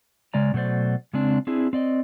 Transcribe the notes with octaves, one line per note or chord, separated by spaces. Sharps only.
C#3 G#3 D5 A#5
B2 F#3 A3 C5 D5
C#3 G#3 C4 D4
C4 D4 E4 G#4
C4 D5 D#5